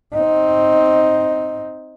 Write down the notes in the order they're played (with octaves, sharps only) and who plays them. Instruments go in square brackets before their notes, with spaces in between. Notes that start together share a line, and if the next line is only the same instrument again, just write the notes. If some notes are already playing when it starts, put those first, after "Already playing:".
[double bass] C4 D#4